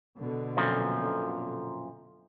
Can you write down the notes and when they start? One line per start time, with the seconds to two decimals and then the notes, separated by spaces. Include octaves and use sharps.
0.18 B2 D3
0.57 F#2 A#2 F3